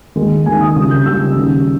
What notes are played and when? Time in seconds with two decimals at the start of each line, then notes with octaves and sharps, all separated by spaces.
0.16 D#2 D#3 G#3
0.46 D#2 D#3 G#3 G#5
0.61 D#6
0.76 C#2 C#3 G3 D#6
0.91 G6
1.06 C#2 C#3 G3 E6
1.36 D#2 C#3 G3